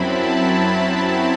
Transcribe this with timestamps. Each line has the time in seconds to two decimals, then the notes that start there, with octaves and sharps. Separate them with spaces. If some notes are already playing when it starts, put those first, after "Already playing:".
Already playing: F#2 F#3 C4 E4 A5 B5
0.24 B5
0.57 A5